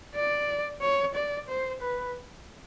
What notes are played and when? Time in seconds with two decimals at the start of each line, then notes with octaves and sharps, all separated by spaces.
0.15 D5
0.82 C#5
1.15 D5
1.49 C5
1.81 B4